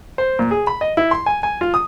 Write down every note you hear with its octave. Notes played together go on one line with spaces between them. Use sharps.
C5
A#2
G#4
B5
D#5
E4
C6
G#5
G#5
F4
D#6